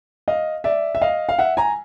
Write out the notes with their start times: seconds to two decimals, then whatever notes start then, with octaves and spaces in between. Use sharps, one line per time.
0.28 D#5 F5
0.64 D5 E5
0.95 E5
1.02 D#5 F5
1.29 F5
1.39 E5 F#5
1.57 G#5 A#5